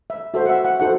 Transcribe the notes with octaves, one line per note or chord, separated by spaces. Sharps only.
E5
F#4 A4 C5 E5
F#5
E5
F#5
D#4 F#4 A4 C5 F#5